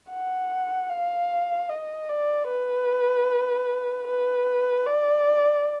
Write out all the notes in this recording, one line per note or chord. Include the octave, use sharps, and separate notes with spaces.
F#5
F5
D#5
D5
B4
B4
D5